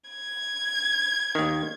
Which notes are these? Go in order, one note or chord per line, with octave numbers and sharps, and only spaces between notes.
G#6
D#2 D#3